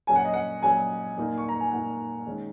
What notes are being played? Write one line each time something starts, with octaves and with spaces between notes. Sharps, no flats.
A#2 F#3 C#4 G#5
F#5
D#5
F#5
A#2 F#3 C#4 G#5
A#2 A#3 D#4
C#6
A#5
G#5
A#2 A#3 D#4 F#5
D#3 G#3 C#4